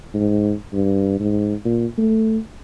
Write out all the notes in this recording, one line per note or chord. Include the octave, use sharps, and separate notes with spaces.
G#2
G2
G#2
A#2
A3